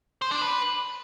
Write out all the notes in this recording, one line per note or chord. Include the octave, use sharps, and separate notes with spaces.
C5
D4
B4